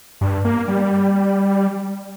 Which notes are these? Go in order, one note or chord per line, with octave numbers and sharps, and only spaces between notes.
G2
A#3
G3